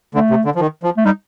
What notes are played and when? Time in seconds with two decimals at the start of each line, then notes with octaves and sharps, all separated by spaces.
0.14 D3 A3
0.30 C3
0.45 D3
0.55 F3
0.60 D#3
0.83 F3
0.97 A3
1.05 G3 D#4